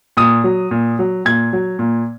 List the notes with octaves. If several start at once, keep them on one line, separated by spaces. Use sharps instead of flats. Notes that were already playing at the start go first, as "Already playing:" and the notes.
A#2 D#6
F#3
A#2
F#3
A#2 G#6
F#3
A#2